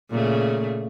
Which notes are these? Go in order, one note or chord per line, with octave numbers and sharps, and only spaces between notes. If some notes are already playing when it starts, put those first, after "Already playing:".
A#2 C#3 A3